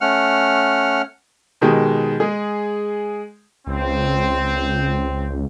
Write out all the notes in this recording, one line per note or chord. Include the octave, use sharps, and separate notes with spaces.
A3 C#4 F#5 F6
B2 D#3 G#3 G4
G#3 G#4
C#2 C4